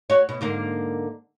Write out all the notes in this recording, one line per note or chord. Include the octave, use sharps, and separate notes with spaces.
F#4 C#5
B2
G#2 D3 A#3